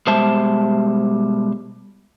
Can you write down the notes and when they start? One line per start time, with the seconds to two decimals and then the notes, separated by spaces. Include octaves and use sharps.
0.07 B2 G3 G#3 C5 E5 A5